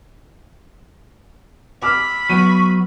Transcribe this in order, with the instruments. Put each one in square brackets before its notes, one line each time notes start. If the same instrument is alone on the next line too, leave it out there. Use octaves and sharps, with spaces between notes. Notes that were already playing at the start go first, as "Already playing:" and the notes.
[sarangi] B5 [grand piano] D6 E6 F6
[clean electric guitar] F#3 B3 [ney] C#6 [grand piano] D#7